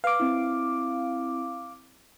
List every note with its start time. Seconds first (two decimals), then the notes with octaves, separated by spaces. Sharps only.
0.04 B4 F5 D6
0.20 C4 E4